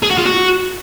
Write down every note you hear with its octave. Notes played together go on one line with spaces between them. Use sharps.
G#4
F#4
F4
F#4